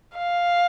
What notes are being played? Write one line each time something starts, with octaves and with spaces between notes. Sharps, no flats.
F5